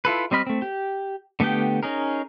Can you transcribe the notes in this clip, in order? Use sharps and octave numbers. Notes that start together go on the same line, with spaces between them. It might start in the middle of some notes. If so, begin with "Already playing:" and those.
E4 F4 A4 B4
G3 C4 D#5 B5 F6
A3 C4
G4
D3 A3 B3 G4 G5
C#4 D#4 G#4 A#4